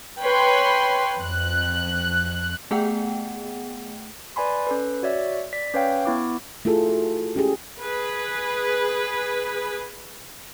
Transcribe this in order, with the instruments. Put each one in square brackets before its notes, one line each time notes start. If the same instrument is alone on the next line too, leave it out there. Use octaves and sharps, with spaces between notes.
[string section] B4 C#5 G5 B5 C6
F2 F#6
[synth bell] A3 B3 G#4 F#5 G5
[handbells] B4 D5 G#5 B5 C6
C#4 A4 B4
F#4 C#5 D5 E5
D5 B6
C#4 B4 C#5 F5 G5
B3 E4 D6
[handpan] A3 E4 F4 G#4 A4
F#4
C#4 G4 G#4
[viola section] G#4 B4